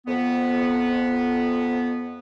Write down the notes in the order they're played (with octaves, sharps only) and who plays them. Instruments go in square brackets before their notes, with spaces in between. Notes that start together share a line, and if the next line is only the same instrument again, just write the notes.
[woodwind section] F2 B3